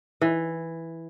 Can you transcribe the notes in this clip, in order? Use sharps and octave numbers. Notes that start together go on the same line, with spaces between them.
E3